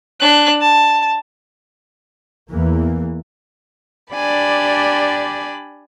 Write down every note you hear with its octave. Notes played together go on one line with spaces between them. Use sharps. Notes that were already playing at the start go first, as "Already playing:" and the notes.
D4 F#6
A5
E2 E3 A#3
D4 G4 D5 G#5 B5